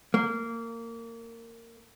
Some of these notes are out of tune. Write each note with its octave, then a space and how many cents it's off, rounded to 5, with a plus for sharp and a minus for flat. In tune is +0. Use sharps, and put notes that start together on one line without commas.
A#3 -20